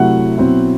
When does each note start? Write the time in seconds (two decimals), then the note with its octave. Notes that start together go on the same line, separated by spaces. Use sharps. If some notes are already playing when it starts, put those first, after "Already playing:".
Already playing: C3 F#3 A3 E4 F#5
0.37 B2 F#3 C4 E4